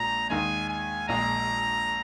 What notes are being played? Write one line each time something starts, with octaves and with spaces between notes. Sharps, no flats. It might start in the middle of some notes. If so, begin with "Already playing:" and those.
Already playing: A#1 A#2 G#3 A#5
D#2 D#3 G#3 G#5
G#5
A#1 A#2 G#3 A#5